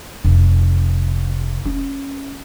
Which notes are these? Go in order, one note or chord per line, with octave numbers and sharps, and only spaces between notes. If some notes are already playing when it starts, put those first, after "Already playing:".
F1
C#4